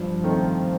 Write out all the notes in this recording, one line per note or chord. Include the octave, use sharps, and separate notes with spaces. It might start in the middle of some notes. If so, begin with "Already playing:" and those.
Already playing: G2 F3
D#3 A3 C4